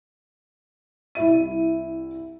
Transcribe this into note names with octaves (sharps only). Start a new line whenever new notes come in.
C2 E4 E5 D#7